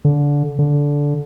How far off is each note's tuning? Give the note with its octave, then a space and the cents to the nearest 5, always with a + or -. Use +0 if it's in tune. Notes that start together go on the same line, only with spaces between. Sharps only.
D3 -20
D3 -15